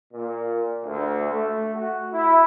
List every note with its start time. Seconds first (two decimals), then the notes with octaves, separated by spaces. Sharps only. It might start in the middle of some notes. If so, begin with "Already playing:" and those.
0.12 A#2
0.84 D2
1.30 A3
1.75 F#4
2.12 E4